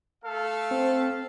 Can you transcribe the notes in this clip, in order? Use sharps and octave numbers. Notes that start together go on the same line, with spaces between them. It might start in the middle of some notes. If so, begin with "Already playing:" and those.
A3 A4 F5
C4 C5